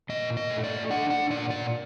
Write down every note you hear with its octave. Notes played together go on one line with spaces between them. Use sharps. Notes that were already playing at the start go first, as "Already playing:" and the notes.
A#2 D#5
D#5
A3
D5
D4 F#5
F#5
A#2 D5
D5